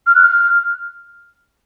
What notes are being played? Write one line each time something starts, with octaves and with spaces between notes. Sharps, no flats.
F6
F#6
F6